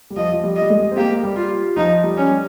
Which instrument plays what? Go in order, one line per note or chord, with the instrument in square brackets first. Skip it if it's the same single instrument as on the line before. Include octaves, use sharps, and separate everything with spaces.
[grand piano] G3
[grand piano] F3 [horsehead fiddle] D#5
[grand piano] F3
G3
[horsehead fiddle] D#5
[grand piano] G3
G#3
C4
[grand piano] A#3 [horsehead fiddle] G4
[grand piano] G3
[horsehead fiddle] F4
[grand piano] F3 [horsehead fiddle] D#4
[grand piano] G3
[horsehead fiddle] C#4
[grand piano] G3